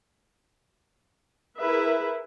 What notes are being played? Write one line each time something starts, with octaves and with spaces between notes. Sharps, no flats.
E4 G#4 A#4 B4 E5